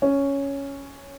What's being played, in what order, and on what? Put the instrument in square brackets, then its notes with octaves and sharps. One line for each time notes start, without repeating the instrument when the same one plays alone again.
[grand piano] C#4